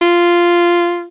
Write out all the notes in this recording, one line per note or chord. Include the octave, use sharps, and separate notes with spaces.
F4